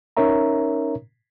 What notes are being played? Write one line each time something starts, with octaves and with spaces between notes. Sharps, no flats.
C#4 D#4 A#4 C#5 E5 A#5